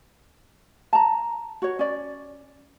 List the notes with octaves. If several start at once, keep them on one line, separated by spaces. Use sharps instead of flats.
A5 A#5
F#4 C#5
C#4 D5